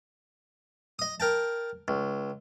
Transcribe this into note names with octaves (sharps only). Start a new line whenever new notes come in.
D#5 D#6
A#4 G5 A5
C#2